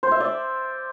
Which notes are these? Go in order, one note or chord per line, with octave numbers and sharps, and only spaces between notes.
C5
E5
D5